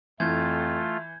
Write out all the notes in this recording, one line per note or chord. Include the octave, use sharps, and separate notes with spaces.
F2 E3 A3 F4 G6 G#6